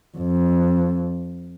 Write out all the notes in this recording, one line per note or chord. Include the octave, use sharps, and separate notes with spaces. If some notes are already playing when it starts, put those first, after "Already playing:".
F2